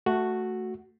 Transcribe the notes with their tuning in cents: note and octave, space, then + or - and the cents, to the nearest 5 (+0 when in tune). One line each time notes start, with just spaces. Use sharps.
A3 +0 F#4 +0